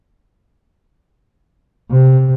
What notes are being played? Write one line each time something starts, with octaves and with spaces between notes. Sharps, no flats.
C3